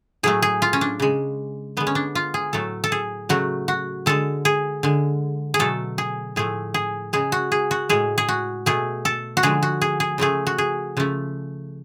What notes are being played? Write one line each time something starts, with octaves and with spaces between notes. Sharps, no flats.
A2 F#3 A3 G#4
G#4
F4
C#4
D4
C#3 G#3
D3 G#3 B3
C#4
D4
F4
G#4
A2 F#3 A3 A4
A4
G#4
C#3 F#3 A3 F#4
F#4
D3 G#3 A4
G#4
D3 G#3
G#4
B2 F#3 A3 A4
G#4
A2 F3 A3 G#4
G#4
C#3 G#3 G#4
F#4
G#4
F#4
A2 G#3 G#4
G#4
F#4
B2 A3 G#4
A4
F#4
D3 F3 G#3 G#4
F#4
G#4
G#4
C#3 F3 A3 G#4
F#4
G#4
C#3 F3 A3